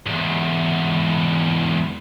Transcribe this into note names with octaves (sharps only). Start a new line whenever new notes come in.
E2 G#2